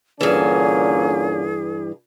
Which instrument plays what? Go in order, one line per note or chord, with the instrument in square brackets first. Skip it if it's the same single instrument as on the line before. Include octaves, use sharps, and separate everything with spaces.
[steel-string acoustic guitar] G2 E3 [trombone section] A#2 D3 C#4 [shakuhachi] G#4